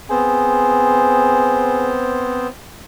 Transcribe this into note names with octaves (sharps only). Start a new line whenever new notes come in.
B3 C4 G#4 C5